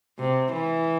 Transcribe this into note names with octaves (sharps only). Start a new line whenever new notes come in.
C3
E3